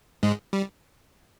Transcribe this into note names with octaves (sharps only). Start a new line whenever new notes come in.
G#2 G#3
G3